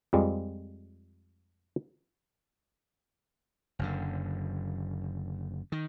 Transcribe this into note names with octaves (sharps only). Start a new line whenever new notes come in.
F2 F3 G3 G#3
F#1 F#2 D3
D#3